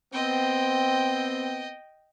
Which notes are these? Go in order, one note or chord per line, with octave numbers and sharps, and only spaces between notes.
B3 C4 D#5 G5